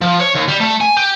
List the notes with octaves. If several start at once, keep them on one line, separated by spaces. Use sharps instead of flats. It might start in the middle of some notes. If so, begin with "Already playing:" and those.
F3
C#5
D#2
G3
A3
G#5
G4